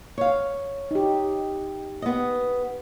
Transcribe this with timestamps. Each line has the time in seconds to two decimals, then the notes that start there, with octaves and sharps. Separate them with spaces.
0.18 C#5 F5
0.91 D#4 G4
2.02 B3 D#5